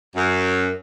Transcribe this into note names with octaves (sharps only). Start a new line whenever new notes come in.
F#2